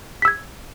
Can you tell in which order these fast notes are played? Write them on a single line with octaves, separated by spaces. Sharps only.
B6 E6 G#6